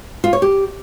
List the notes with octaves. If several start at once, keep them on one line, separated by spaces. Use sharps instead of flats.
F4
C#5
G4